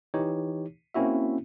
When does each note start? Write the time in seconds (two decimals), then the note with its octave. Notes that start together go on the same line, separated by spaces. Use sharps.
0.14 E3 D#4 G4 C#5
0.94 A#3 C4 C#4 E4 F#4 E5